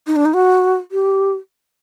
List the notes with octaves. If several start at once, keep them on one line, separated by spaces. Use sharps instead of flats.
D#4
D4
D#4
F#4
G4